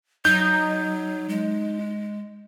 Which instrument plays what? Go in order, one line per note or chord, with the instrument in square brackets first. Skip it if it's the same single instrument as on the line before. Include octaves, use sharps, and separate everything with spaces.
[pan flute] F#3 [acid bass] D#4 [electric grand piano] G6
[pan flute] G#3